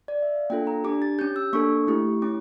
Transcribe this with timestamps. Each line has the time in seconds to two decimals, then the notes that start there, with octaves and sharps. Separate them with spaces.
0.08 D5
0.22 E5
0.36 F5
0.50 A#3 D4 F4 A4 G5
0.67 A#5
0.84 D4 G4 D6
1.02 A6
1.19 C#4 G4 G6
1.36 E6
1.53 A#3 D4 A4 C#6
1.87 A3 E4 G4
2.22 C#4 E4 D6